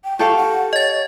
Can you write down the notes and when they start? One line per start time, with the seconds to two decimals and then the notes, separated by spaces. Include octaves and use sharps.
0.04 G5
0.19 G4 A4 F5 C#6
0.36 F#5
0.73 C#5 D#5 A6